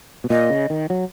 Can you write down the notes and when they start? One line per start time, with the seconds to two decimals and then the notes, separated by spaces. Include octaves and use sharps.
0.24 B2
0.30 A#2 D#5
0.50 C#3
0.70 D#3
0.90 F#3